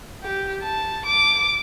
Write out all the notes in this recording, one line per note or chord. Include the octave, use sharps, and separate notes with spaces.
G4
A5
D6